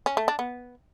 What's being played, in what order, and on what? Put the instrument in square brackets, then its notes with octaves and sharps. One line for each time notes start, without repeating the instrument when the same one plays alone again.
[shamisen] C#4
A3
D4
B3